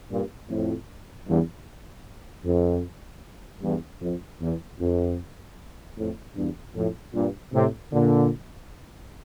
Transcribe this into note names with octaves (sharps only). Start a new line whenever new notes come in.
G2 A#2
F2 A2
E2 G2
F2
E2 G2
F2
E2
F2
F2 A2
E2 G2
F2 A2
G2 A#2
A2 C3
A#2 D3